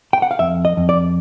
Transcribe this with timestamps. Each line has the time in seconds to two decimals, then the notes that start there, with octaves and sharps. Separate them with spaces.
0.13 G5
0.22 F#5
0.31 F5
0.39 F2 E5
0.65 D#5
0.77 F2
0.89 D5